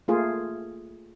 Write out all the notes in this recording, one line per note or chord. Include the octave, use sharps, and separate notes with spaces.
A3 A#3 F4 G#4